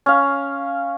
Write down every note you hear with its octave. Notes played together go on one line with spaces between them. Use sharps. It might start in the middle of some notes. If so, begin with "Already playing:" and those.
C#4 F5